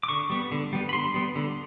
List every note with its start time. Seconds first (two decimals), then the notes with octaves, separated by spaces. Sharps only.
0.03 D6
0.09 D3 C#6
0.30 G3 B3
0.52 D3
0.73 G3 B3
0.89 B5
0.93 D3 C6
1.14 G3 B3
1.36 D3